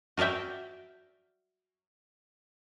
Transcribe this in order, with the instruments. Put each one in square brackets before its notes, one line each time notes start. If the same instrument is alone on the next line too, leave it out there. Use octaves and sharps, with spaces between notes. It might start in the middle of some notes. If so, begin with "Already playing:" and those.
[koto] F#4 A#4 D5 E5 G5